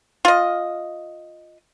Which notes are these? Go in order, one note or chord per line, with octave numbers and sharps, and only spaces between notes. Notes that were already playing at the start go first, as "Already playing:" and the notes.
F4 D#5